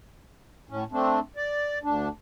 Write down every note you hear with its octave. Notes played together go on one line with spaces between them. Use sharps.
A2 C#4
A3 C4 D4
D5
D2 D4